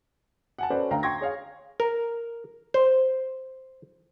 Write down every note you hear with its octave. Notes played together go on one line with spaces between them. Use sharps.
F#5 G#5 A5
C#4 F#4 A4 B4 C5 D5
D2 F5 G5 A#5
G5 C6 C#6 G#6 A#6
G#4 C#5 F5
A#4
C5